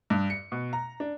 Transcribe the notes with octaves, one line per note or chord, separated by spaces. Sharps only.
G2
C#7
B2
A#5
D4